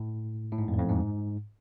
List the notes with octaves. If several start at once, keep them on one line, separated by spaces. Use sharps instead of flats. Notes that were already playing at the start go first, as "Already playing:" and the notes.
Already playing: A2
A2
G#2
F2
E2
F2
G#2